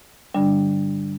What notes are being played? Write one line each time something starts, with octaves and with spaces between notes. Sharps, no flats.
G2 D3 G3 D4